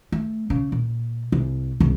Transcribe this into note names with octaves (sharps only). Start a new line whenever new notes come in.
A3
C#3
A#2
C2
C2 C#3